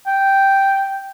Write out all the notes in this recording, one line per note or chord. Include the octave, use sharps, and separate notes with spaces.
G5